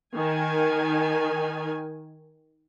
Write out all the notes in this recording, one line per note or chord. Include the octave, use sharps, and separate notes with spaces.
D#3 G#5